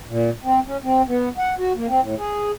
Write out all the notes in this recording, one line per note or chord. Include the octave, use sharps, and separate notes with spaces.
A#2
C4
C#4
C4
B3
F#5
F#4
A#3
C4
A2
G#4